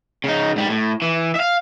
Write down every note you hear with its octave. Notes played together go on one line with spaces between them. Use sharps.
C#3 D#4
G#2 G3
A2
E3
E5 F5